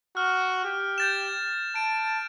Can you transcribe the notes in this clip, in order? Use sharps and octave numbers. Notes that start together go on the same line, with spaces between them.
F#4 F6
G4
G6 A6 E7
A5 D7